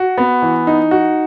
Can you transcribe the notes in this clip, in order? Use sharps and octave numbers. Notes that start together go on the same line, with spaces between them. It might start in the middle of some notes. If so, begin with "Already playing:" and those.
Already playing: F#4
B3
E3
D#4
F#4